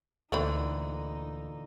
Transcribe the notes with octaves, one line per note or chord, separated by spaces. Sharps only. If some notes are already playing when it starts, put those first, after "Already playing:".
D2 A#2 D3 E3 A3 C4 D#4 B5